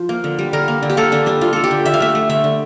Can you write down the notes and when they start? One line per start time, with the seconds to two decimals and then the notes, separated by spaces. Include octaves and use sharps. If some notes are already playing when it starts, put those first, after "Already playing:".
Already playing: F3 C5
0.09 A#3
0.24 D3
0.39 G3
0.53 D3 A#4
0.68 A#3
0.83 D3
0.90 G4
0.97 A#3 A4
1.12 D3 D4
1.26 G3 D4
1.41 D3 F4
1.53 A#3 A4
1.64 G4
1.71 D3
1.85 D3 E5
1.94 F5
2.00 A3 E5
2.15 A3
2.30 D3 E5
2.44 D3